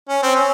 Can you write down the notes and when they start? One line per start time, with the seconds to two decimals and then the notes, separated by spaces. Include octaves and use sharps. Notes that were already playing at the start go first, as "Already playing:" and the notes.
0.09 C#4
0.23 C4
0.35 C#4